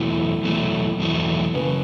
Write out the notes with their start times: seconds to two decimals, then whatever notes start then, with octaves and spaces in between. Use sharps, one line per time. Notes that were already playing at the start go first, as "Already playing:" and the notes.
Already playing: E2 B2 F#3 A3 E4
0.43 E2 B2 F#3 A3
1.00 E2 B2 F#3 A3
1.54 F#2 C#3 B4